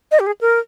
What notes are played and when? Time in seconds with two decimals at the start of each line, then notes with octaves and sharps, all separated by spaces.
0.11 D#5
0.20 G4
0.27 G#4
0.41 A#4